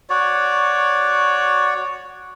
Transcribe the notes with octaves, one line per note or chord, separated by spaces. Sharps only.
F#4 C#5 D5